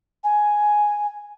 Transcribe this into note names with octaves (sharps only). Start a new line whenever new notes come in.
G#5